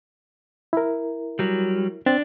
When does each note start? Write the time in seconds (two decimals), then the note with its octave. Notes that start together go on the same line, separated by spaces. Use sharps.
0.73 E4 A#4
1.39 F#3 G3
2.06 C4 D4 A6